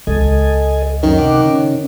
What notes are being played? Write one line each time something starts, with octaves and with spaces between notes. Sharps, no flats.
C#2 A4 D#5 G#5
F#2 D#3 F#3 C#4
C3 F#5 D6
C#3 C#4